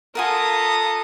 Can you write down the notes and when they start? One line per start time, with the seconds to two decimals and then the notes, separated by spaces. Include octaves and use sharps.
0.15 B3 F4 A4 A#4 F#5 G#5 A#5 D#6